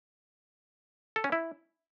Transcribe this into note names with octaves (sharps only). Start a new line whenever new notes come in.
A4
C#4
E4